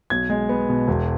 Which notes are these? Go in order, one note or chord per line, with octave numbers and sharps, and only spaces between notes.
B1 G#6
G#3
B3
B2
E1